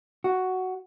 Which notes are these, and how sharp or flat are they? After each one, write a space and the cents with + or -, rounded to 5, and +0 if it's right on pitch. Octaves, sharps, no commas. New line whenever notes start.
F#4 +5